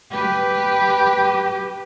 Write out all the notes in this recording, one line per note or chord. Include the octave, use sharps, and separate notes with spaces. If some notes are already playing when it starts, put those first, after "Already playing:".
G4 B4